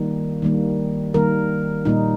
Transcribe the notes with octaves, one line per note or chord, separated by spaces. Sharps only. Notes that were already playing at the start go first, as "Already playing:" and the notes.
Already playing: D#3 G3 A#3
D#3 G3 A#3
D#3 G3 A#3 A#4
A#2 G3 A#3 D#4